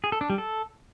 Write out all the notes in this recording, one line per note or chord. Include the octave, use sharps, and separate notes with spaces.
G#4
A4
D4
G3
A4